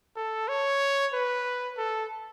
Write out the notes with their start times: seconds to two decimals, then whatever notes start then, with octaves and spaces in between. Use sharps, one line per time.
0.16 A4
0.48 C#5
1.13 B4
1.77 A4